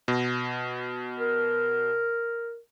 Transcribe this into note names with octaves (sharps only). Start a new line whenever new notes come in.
B2
A#4